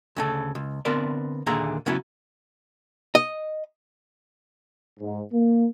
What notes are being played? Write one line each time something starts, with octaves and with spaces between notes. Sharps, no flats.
D2 C#3 A4
C#2
D3 B3 C4 A#4 B4 D5
D#2 A#2 D3 G#4 E5 A#5
C#3 F#3 B3 C#4 E4
D#5
G#2
A#3